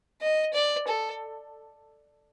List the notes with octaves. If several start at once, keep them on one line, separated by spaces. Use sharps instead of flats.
D#5
D5
A4